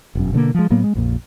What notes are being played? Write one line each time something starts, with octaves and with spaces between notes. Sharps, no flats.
E1 F#2
B2 D3 G#3 A#3
F3 G#3
A2 F#3 A#3 B3
G#3
A#1 F2 A#2